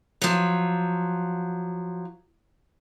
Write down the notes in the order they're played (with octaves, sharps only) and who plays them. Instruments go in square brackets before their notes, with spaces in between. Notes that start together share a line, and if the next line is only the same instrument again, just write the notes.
[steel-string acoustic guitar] F3 F#3